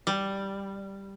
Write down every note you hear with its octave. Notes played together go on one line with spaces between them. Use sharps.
G3